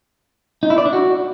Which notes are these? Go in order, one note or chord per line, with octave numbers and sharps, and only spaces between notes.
D#4
E4
D5
D4
F#4